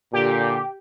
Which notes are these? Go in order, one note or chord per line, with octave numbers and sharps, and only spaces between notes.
A#2 D3 G4